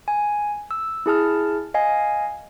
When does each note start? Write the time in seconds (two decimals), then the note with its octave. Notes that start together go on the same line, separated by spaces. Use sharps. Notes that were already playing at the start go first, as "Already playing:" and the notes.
0.08 G#5
0.71 E6
1.06 E4 G#4 A5 F6
1.74 D#5 F5 G#5